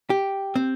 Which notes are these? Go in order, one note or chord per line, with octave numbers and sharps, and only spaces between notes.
G4
C4